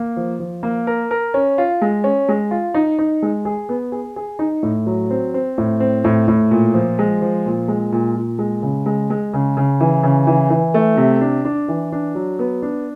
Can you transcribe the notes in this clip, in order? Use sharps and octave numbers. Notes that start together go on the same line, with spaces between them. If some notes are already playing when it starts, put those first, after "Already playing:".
Already playing: A#3
F3
F3
A#3
A#4
A#4
C#4
F4
G#3
C#4
G#3
F4
D#4
D#4
G#3
G#4
B3
G#4
G#4
D#4
A2
F#3
C4
C4
A2
C4
A2
A2
A#2
F3
G#3
F3
A#2
G#3
A#2
A#2
G#3
C#3
G#3
G#3
C#3
C#3
E3
C#3
E3
E3
A3
C3
D4
D4
E3
D4
F#3
B3
D4